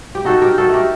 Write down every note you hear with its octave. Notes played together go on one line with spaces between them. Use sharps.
G4
D#4 F#4 A4
G4 A#4
D#4
F#4 A4
A3
G4 A#4